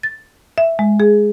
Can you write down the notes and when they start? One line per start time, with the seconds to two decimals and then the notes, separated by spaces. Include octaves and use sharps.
0.03 A6
0.58 E5
0.79 G#3
1.00 G#4